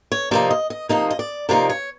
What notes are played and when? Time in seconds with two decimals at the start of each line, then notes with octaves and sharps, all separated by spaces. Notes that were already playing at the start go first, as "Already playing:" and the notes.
0.12 C#5
0.31 C3 F3 A#3 D#4 D5
0.50 D#5
0.70 D#5
0.89 C3 F3 A#3 D#4 D#5
1.10 D#5
1.19 D5
1.49 C3 F3 A#3 D#4 D5
1.69 C#5